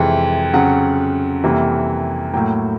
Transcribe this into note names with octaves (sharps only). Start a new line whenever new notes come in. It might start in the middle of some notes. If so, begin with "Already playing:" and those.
Already playing: F2 C3 E3 G#3
F2 C#3 F#3 F#5
F2 C3 E3 G3 A#3
A2 F#3 A#3 G5